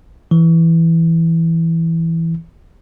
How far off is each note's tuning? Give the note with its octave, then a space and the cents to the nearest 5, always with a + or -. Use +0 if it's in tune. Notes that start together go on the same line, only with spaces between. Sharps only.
E3 +0